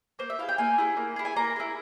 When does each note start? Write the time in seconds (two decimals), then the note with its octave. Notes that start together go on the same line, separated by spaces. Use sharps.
0.19 A#3 C5
0.30 E5
0.39 E4 G#4 F5
0.49 G5
0.58 A#3 G#5
0.78 E4 G#4
0.97 A#3
1.16 E4 G#4
1.25 G#5
1.36 A#3 A#5
1.56 E4 G#4